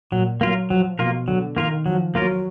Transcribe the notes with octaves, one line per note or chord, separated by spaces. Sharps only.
A#2 F#3
F#3 A#3 F4 A#4
F3 F#3
B2 A#3 F4 A#4
D3 F#3
D#3 A#3 F4 A#4
F3 F#3
F#3 A#3 F4 A#4